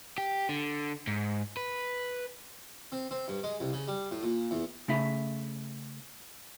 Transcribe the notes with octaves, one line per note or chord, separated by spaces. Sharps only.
G4
D3
G#2
B4
C4
C4
G2
G#3
C2
C#3
G3
A2
A#2
E2
C#3 A3 E4 E5